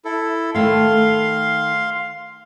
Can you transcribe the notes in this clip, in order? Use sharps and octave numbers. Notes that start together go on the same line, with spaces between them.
E4 A4
D#3 A3 F5 C6